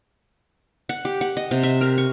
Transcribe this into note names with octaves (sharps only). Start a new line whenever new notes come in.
F#5
G4
F#5
D#5
C3
E5
A#4
C#6